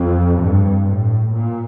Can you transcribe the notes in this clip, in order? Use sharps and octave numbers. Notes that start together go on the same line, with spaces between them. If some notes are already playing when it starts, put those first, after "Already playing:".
Already playing: F2
G2
A2
A#2